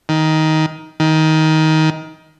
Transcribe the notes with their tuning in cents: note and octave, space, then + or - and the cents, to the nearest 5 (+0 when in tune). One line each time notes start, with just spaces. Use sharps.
D#3 +15
D#3 +20